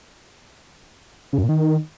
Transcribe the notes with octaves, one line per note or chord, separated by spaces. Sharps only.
C#3
F#2
A#2
D#3